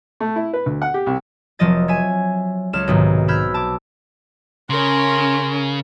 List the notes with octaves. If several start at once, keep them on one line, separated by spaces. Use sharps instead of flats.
A3
E4
B4
D2
F#5
G4
C2
F1 F3 F#3 D#5 A6
C#5 E5 G#5
C#2 A4 C#5 F6 G#6 E7
B1 G#2 C3 D#3
B5 E6 F6 G6 G#6 B6
A5 D6
C#3 C#4 A#4 C6